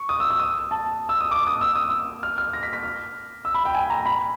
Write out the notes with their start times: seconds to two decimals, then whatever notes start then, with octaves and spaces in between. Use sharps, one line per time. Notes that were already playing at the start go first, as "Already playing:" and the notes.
Already playing: C#6
0.09 D#6
0.20 E6
0.30 E6
0.40 D#6
0.71 A5
1.09 E6
1.21 D#6
1.31 D6
1.47 D#6
1.61 E6
1.75 D#6
1.90 E6
2.23 F6
2.38 F6
2.53 A#6
2.63 B6
2.73 B6
2.83 F6
3.45 E6
3.54 B5
3.65 G5
3.75 G#5
3.90 A#5
4.06 B5